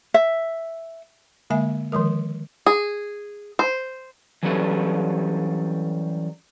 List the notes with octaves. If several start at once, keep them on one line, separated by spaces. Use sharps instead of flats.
E5
D3 G#3 A#3 E5 G#5
D#3 F3 G#3 A#4
G#4
C5
E3 F#3 G3 C#4 A4 B4